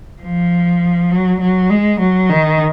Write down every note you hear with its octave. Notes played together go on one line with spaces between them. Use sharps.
F3
F#3
F#3
G#3
F#3
D#3